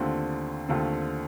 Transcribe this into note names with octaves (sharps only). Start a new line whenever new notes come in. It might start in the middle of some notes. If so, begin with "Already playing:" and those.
Already playing: D#2 D3 A3 C4 F4
D#2 D3 A3 C4 F4